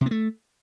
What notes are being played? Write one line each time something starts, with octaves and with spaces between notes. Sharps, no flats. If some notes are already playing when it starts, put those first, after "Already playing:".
C3
B3
A3